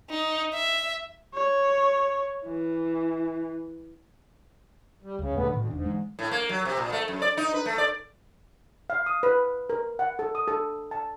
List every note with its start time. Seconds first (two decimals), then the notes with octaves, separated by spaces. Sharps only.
0.10 D#4
0.54 E5
1.34 C#5
2.46 E3
5.03 G3
5.19 C#2 C#3
5.35 D#1 D3 A3 B3
5.53 D2 A2 D#3
5.70 E1 G#2 D4
5.86 E3 G#3
6.19 A2
6.31 A#3
6.49 F#3
6.65 C3
6.77 A#2
6.92 A3
7.08 F#2
7.22 D5
7.37 D#4
7.54 B4
7.66 A3
7.78 D5
8.90 F5
9.06 D#6
9.23 B4
9.70 A#4
9.99 F#5
10.19 A4
10.35 D#6
10.48 A4
10.91 A5